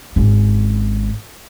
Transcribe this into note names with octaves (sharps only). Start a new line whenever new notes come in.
G#1 C#4